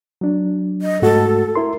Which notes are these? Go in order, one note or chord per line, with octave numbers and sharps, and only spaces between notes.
F#3 D4
D#5
G#2 A3 F#4 A4
E4 A#4 C6